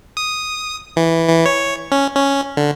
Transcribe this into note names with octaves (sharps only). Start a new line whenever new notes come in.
D#6
E3
E3
C#5
C#4
C#4
D3